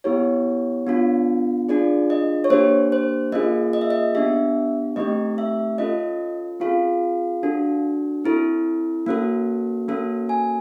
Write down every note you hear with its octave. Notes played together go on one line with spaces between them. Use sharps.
B3 E4 G4 C#5
B3 D4 F4
D4 F4 G#4 D5
D#5
C#5
A#3 D4 G4 C5
C5
A#3 C#4 F4 G#4 D#5
D#5
E5
D#5
B3 D4 G4 E5
A3 C4 D#4 G4 D#5
E5
C#4 F4 A4 D#5
C4 F4 G#4 F5
D4 F#4 A4
C4 E4 A4
A#3 C#4 F#4 A4
A#3 C#4 F#4 A4
G#5